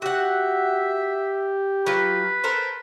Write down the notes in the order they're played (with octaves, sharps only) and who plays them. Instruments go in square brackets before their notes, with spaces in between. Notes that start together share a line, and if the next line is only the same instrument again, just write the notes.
[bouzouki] F#4 F#5 [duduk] G4 [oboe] E5
[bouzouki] F#3 F4 [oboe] B4
[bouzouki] A4 A#4 C5